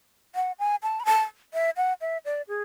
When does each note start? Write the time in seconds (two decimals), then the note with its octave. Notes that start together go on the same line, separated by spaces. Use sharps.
0.35 F#5
0.59 G#5
0.83 A5
1.00 B5
1.05 A5
1.54 E5
1.77 F#5
2.01 E5
2.25 D5
2.48 G#4